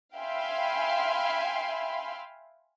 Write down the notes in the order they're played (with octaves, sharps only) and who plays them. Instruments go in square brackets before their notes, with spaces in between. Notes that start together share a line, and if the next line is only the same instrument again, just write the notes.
[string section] E5 F5 G5 G#5 B5 C6